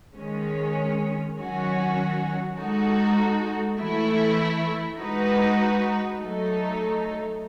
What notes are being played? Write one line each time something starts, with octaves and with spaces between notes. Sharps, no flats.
D#3 G#3 C#4
D#3 F#3 C#4 F#4
G#3 D#4 F#4 A4
E3 A3 E4
G#3 D#4 F#4 B4
F#3 A3 D#4 A4